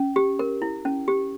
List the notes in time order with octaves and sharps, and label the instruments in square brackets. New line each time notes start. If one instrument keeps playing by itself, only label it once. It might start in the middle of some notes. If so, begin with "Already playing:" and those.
Already playing: [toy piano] C#4
G4
A#4
E4
C#4
G4